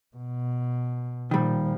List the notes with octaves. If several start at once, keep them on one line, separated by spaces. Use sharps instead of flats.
B2
A#2 D#3 F3 G3